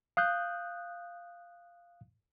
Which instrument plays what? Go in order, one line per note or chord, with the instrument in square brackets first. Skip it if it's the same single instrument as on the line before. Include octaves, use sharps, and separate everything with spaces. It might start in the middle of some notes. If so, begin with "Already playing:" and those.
[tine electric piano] F5 D#6 F#6 G6